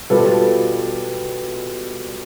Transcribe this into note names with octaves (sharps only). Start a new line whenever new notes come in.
B2 G3 B3 F4 A4